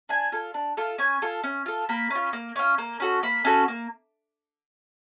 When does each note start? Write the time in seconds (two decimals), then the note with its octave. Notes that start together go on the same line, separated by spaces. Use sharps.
0.09 D4 G#5
0.32 F4 A4
0.54 D4
0.77 F4 A4
0.98 C#4 G#5
1.22 F4 A4
1.43 C#4
1.66 F4 A4
1.89 A#3 B5
2.10 C#4 F4
2.33 A#3
2.56 C#4 F4
2.78 A#3
3.00 C#4 F#4 A4
3.23 A#3 B5
3.45 C#4 F#4 A4
3.68 A#3